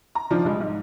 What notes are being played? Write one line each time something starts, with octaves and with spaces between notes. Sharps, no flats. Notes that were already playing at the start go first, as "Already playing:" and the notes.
A#5
D#3 F3 D4 F4
B1 G3 G#3
G#2